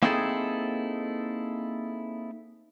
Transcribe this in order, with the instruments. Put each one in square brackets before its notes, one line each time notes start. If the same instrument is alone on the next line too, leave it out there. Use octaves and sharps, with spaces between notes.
[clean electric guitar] A#3 C4 D#4 E4 G#4 A4